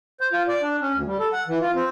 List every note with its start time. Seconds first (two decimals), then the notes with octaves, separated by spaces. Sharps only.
0.21 C5
0.33 F4
0.48 D5
0.62 D4
0.81 C#4
0.93 D2
1.06 G3
1.20 A4
1.33 F#5
1.48 E3
1.61 F4
1.74 C4